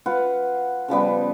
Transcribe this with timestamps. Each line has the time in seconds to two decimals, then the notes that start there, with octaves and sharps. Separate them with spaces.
0.06 F4 B4 F5 F#5
0.88 C#3 F3 G3 B3